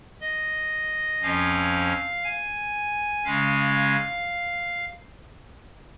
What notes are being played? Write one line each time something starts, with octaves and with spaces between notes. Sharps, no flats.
D#5
F2 F3 C#4 F5
G#5
C#3 G#3 C#4 F5